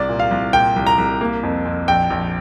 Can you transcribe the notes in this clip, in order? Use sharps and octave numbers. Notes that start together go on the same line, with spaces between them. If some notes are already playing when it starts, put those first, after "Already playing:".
Already playing: C2 D5
A#2
F5
C2
A#2 G5
C2
A#5
C2
A#3
F2
F2
A#1 G5
A#1